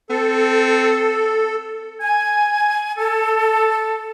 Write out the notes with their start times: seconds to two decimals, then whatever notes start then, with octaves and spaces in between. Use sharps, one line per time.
0.10 C4 A4
2.00 G#5
2.98 A4